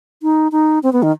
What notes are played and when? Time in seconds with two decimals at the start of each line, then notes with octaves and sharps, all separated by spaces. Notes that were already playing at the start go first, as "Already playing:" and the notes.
0.22 D#4
0.52 D#4
0.83 C4
0.93 B3
1.03 D#3